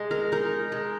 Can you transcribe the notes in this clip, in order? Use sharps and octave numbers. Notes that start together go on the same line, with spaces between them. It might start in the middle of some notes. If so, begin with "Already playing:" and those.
Already playing: G#3 D#4 G#4
A#4
D#4 A#4
G#3